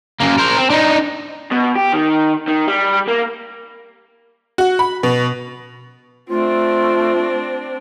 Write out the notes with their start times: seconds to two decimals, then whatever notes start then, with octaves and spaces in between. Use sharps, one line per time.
0.21 F#2 A#3
0.38 A#4 C5
0.58 C4
0.70 D4 D#4
1.52 B2
1.76 G4
1.93 D#3
2.48 D#3
2.68 G3
3.08 A#3
4.58 F#4
4.79 B5
5.03 B2
6.30 A3 C4 D4 F4